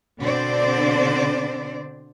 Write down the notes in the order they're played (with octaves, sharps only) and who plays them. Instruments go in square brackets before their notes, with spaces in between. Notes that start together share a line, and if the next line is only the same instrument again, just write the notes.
[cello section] B2 D3 C4 D4 C5 D5